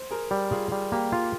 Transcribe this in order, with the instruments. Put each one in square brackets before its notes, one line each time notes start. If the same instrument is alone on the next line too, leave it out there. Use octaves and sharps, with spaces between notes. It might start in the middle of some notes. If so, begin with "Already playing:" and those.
Already playing: [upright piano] C5
[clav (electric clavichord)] G#4 [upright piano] A#4
[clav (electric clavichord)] G3
[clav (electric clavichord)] F4 [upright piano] G#4
[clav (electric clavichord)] G3
[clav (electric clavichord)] A#3 [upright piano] G4
[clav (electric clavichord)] F4